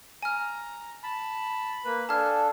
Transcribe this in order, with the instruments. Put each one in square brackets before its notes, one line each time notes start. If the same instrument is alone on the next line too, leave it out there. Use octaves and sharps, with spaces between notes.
[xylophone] G#5 F6 [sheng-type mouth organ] A#5
[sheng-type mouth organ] A5 [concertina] B5
[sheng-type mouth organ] A#3 B4
[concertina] D4 A4 F5 [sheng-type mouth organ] G#5 [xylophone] A5 F6